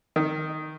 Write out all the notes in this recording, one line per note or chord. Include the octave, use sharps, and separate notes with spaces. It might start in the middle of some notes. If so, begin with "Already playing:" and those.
D#3